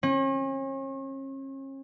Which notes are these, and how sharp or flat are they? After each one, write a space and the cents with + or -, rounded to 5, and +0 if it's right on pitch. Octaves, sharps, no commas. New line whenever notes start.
C#4 -40